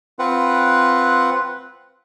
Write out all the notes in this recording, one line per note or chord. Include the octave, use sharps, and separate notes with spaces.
C4 F4 B4 F#5